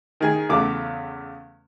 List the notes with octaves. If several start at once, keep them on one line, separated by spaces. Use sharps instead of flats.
D#3 G#4
E2 C#3 A3 D6